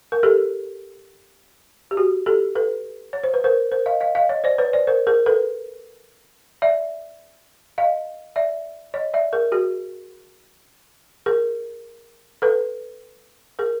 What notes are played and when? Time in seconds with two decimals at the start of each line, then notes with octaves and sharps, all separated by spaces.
0.12 A#4
0.23 G4 A4
1.91 G4
1.97 F#4 G#4
2.26 G4 A4
2.55 A4 B4
3.13 C#5
3.24 C5
3.34 B4
3.44 A#4 C5
3.71 A#4 C5
3.86 D#5 F5
4.00 D#5 F5
4.15 D#5 F5
4.29 C#5 D#5
4.44 C5 D5
4.58 B4 C#5
4.73 C5 D5
4.87 A#4 C5
5.07 G#4 A#4
5.26 A4 B4
6.62 D5 E5
7.78 D#5 F5
8.36 D5 E5
8.94 C#5 D#5
9.14 D5 E5
9.33 G#4 A#4
9.52 F#4 G#4
11.26 G#4 A#4
12.42 A4 B4
13.59 G#4 A#4